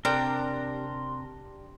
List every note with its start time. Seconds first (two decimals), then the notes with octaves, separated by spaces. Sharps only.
0.05 C3 D4 G4 A#4 G5 C6